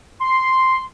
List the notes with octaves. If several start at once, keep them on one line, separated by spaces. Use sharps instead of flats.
C6